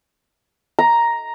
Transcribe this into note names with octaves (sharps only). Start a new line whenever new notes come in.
A#5